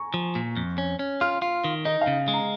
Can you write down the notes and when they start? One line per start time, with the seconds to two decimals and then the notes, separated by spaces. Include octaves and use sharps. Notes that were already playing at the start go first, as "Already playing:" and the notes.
Already playing: G#5 A#5 C#6
0.14 F3
0.35 A#2
0.56 F2
0.78 C#4
0.99 C#4
1.21 F4 F6
1.42 F4
1.64 D#3
1.85 D#4 D#5
2.01 F5
2.07 C#3
2.28 G#3
2.33 A#5